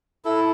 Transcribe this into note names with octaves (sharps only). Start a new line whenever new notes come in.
E4 A4